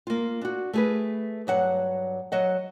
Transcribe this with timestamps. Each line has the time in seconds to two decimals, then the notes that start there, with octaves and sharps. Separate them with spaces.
0.07 A#3 F4
0.41 D4 F#4
0.73 A3 G#4 B4
1.47 G2 F#3 F#5
2.32 F#3 D#5 F#5